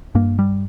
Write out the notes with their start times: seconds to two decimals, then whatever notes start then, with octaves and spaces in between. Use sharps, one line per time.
0.15 G2 A#3
0.39 G3